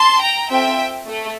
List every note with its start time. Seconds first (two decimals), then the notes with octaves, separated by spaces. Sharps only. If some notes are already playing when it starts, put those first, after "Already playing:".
Already playing: A5 C6
0.21 G5 A#5
0.50 C4 F4 A4 E5 G5
1.08 A3